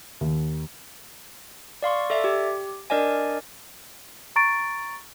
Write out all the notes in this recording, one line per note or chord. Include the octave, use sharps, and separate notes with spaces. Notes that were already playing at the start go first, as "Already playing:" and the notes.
D#2
D5 F5 C6 C#6
A4 D5 E5
G4
D4 A#4 D5 D#5 G#5
A#5 C#6 A6 D7